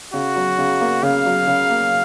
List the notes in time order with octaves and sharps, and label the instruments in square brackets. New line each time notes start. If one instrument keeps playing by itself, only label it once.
[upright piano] C#3 [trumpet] F#4
[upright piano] F#3
C#3
A#3
[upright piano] C#3 [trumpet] F5
[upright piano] F#3
C#3
A#3